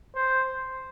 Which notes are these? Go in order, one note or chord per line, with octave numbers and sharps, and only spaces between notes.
C5